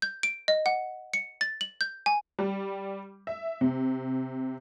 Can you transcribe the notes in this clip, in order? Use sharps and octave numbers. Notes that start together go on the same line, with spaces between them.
G6
D7
D#5
F#5
C#7
A6
F#7
G6
G#5
G3
E5
C3